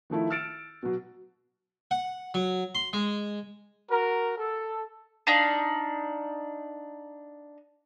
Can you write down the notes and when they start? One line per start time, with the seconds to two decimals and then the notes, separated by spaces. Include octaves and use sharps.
0.10 D#3 F3 A3 E4
0.30 E6 F6 A6 C#7 D7 E7
0.83 B2 F#3
1.91 F#5
2.34 F#3
2.75 C6
2.93 G#3
3.91 F#4 A#4
4.37 A4
5.27 D4 D#4 F5